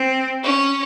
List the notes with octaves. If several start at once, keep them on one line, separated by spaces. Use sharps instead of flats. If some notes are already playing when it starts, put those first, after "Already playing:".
Already playing: C4
C#4